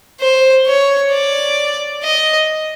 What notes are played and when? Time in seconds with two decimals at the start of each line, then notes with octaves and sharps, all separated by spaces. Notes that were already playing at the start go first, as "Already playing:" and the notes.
0.20 C5
0.67 C#5
1.12 D5
2.03 D#5